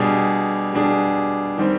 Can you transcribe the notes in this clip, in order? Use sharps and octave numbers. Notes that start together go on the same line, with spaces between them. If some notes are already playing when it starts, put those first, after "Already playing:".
Already playing: B2 G3 D4 G#4
B2 G3 D4 G#4
D#3 G3 C4